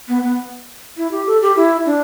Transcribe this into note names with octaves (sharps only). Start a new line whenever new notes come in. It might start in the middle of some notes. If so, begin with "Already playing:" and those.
B3
B3
E4
G4
A4
G4
E4
D4